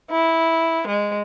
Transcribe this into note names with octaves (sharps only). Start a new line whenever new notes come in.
E4
G#3